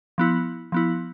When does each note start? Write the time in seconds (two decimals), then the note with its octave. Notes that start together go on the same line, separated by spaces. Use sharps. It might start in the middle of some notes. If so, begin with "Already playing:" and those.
0.18 F3 B3 E4
0.72 F3 B3 E4